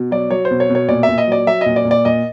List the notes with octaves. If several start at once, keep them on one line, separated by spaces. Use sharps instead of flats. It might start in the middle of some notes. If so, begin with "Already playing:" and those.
Already playing: B2
F#3 D5
F#3 C#5
C5
B2
C#5
B2
C#5
A#2 D5
E5
A#2
D#5
F#3 D5
F#3 E5
A#2 D#5
D5
A#2
D5
A#2 D#5